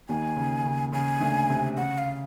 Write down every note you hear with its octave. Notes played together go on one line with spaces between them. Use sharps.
D#2 D#3 G#5
C#3
C#3
C#3 G#5
D2 D3
C3
C#3 F#5
F5